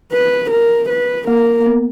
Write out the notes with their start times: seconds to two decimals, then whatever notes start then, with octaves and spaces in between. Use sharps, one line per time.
0.13 B4
0.51 A#4
0.90 B4
1.27 A#3 A#4
1.60 A#3
1.66 B3